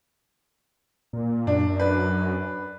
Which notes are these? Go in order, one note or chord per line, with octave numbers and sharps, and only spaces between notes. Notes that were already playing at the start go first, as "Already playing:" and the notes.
A#2
F#2 D4
D4 B4